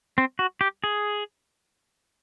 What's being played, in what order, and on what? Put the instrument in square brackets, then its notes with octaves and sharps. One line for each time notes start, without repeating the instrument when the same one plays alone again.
[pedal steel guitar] C4
F#4
G4
G#4